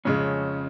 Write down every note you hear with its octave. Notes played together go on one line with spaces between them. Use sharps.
F2 C#3 G#3 C#4